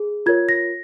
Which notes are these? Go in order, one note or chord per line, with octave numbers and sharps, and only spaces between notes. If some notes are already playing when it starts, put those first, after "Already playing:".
Already playing: G#4
F4 A#4 C#5 G#6
A#6